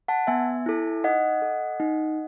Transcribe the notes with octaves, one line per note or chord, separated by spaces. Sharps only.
F#5 A5
B3 E5 G#5
E4 A4
D#4 D#5 F#5
A4
D#4